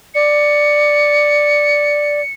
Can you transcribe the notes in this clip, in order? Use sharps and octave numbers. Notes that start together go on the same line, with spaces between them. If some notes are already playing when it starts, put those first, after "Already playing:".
D5 C#7